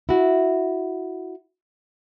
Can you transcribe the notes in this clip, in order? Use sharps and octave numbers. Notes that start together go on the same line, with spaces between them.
E4 F#4